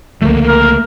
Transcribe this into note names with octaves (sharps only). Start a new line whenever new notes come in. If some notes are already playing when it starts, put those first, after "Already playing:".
C#2 D3 F3 A3 A#3
A#4